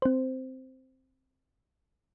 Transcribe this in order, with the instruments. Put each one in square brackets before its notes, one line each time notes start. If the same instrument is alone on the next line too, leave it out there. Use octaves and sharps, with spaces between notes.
[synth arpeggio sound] C4 C5